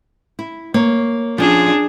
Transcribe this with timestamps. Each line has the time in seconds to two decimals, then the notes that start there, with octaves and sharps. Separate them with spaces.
0.39 E4
0.74 A#3 C#5
1.38 F3 C#4 D4 F4 G#4